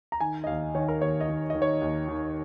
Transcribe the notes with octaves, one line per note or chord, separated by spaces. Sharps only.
A#5
D#3 G#5
D#5
D#2 F5
D#3 C#5
A#4
D#2 C#5
D#5
D#3
D#3 D#5
C#5
D#2
D#3